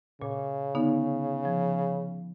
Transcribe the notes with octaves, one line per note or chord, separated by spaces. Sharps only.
A#2 C#3
D3 B3 D#4
F3